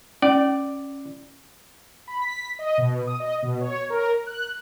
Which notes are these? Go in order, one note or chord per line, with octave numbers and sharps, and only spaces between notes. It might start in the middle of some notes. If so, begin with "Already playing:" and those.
C#4 D5
B5
B6
D#5
B2
D#6
D#5
B2
C#5
A#4
F#6